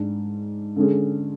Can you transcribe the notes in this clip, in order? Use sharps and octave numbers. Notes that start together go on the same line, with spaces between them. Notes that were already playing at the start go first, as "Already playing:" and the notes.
Already playing: G#2 G#3 D4
D3 G#3 C#4 G#4